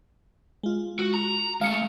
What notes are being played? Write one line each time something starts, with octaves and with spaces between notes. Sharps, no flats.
G#3 F4
F#4
A#5
G#3 A3 F5 C#7